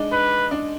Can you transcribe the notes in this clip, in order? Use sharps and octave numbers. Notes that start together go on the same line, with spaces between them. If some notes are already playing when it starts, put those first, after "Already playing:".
Already playing: G#3 D4 D#4
D#4 B4
D4